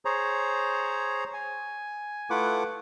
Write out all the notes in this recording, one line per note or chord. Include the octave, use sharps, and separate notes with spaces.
G#4 C5 C#5 A#5
G#5
A3 E4 F4 B4 F#5 D6